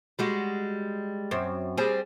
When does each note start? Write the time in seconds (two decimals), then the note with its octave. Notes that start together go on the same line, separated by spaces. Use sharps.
0.19 G3 G#3 F#4
1.31 F#2 C4
1.78 G3 C4 G#4